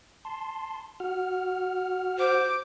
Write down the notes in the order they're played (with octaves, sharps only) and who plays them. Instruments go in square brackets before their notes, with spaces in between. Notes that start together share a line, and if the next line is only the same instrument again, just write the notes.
[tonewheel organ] A5 C6
F#4 F#5 F6
[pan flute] C5 [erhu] D6